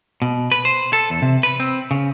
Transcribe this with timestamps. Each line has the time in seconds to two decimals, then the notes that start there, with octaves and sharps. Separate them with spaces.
0.22 B2
0.52 B4
0.65 C5
0.93 A4
1.10 E2
1.22 C3
1.43 B4
1.60 C4
1.91 C#3